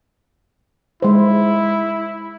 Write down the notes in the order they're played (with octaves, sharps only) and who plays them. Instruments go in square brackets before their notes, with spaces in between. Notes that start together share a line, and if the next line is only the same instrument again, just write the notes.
[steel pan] G#3 C5 [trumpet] E4